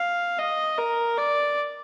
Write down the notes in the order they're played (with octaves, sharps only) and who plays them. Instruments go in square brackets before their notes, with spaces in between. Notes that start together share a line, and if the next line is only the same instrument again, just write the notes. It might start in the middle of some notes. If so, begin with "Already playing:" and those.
Already playing: [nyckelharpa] F5
D#5
A#4
D5